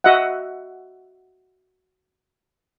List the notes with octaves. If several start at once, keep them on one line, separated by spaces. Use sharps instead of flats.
F#4 D#5 E5 F#5